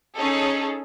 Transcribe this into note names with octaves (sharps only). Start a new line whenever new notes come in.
C#4 D#4 G#4 A4